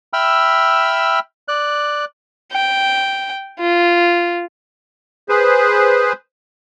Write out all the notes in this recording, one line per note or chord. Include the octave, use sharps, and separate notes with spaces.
E5 G5 B5 E6 F6
D5 F#6
G5
F4
G#4 B4 C5